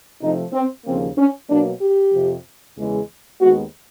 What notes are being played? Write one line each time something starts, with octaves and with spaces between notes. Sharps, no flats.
C3 F3 A3 D#4
C4
D#2 C#3 F3 A#3 C4
C#4
B2 F#3 A#3 D4
G4
F2 C3 F3
E2 C#3 E3 G#3
D#2 D#3 G#3 B3 F#4